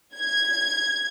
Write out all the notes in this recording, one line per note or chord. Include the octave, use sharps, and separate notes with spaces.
G#6